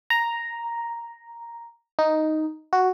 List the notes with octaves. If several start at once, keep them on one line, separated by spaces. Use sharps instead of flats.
A#5
D#4
F#4